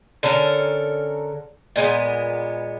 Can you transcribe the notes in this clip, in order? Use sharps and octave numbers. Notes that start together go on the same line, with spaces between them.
D3 C#4 A4 A#4
A#2 G#3 A3 B3